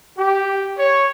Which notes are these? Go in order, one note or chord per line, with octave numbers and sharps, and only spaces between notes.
G4
C#5